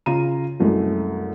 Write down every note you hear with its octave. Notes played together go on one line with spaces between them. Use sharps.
C#3 F4 A#5 D#7
C2 F#2 G#3 A3